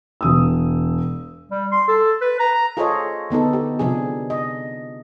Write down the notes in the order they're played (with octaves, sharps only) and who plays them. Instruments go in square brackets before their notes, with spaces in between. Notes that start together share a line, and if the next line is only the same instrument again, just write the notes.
[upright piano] E1 D#6 E6
[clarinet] G3
C6
A4
B4
A#5
[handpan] F4 G#4 A4 C5 C#5 D#5
D3 B3 D#4 A4
G4
C3 F3 D4 G#4
D#5